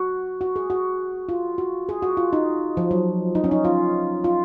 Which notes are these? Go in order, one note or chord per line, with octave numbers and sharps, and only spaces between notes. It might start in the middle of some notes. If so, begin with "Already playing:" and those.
Already playing: F#4
F#4
G#4
F#4
F4
F#4
G#4
F#4
F4
D#4
F3
F#3
D#4
C#4
D#4
F4
F4